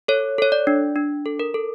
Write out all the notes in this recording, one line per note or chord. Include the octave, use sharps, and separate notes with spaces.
A4 C#5
A4 C#5
D5
D4
D4
A4
A#4
A4